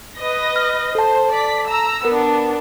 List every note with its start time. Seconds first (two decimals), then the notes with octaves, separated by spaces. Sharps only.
0.17 B4 D#5 A#6
0.56 F6
0.95 A4 C5 A5
1.30 D5 B6
1.69 A#5 E6
2.05 B3 D4 A#4